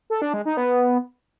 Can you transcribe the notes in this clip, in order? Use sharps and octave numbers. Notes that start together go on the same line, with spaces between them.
A4
D4
G#3
D#4
B3